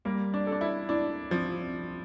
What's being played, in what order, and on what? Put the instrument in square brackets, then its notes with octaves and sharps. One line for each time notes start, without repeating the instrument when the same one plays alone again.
[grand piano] G3 [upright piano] A#3
[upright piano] D4
[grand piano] A4
[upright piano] D4
E4
[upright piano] D4 [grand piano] E4
[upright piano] F3 [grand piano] C4